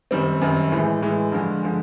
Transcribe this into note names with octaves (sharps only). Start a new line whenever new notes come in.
F#2 D#3 G3 C4
F#2 D#3 G3 C4
A2 E3 G#3
A2 E3 G#3
G2 D3 F3 G#3
D3 F3 G#3